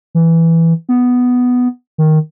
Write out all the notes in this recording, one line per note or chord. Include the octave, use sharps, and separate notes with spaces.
E3
B3
D#3